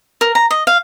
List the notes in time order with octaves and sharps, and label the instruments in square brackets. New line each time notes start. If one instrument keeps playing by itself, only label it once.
[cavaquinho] A#4
A#5
D#5
F5